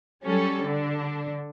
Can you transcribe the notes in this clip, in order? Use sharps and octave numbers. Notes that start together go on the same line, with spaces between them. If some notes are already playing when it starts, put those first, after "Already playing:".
F#3 G3 C#4 A4
D3 D4